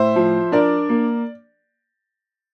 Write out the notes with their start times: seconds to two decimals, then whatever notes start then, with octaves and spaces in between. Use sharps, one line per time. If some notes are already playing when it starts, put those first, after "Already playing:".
Already playing: A2 C5 E5
0.16 F3
0.52 D4 A#4 D5
0.89 A#3